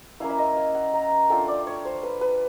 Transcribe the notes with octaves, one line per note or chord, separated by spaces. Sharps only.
A#3 C#4 E4 F5
E5
D#5
F5
F#5
A#5
A3 D4 F4 G5
D5
C#5
C5
B4
B4